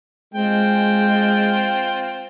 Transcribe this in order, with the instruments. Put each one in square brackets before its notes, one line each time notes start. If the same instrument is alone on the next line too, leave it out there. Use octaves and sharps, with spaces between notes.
[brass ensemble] G#3 [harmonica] C4 F4 G5